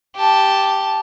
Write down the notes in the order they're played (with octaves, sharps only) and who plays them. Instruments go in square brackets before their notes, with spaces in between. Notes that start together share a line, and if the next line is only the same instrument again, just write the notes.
[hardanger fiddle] G4 A5